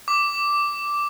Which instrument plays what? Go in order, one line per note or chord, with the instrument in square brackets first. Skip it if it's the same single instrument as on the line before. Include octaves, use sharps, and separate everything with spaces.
[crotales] D6